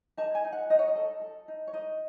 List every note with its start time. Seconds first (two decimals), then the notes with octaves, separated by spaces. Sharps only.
0.17 D#4 A5
0.35 G#5
0.45 D#4
0.52 F#5
0.70 D#4 D#5
0.79 C#5
0.88 D#5
0.96 A4
1.22 A4
1.48 D#4
1.67 C#5
1.73 D#4 D#5